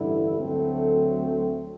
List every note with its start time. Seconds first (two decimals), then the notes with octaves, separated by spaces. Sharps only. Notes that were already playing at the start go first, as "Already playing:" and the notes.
Already playing: A1 G2 D3 A3 E4
0.38 D2 D3 F#3 A3 C4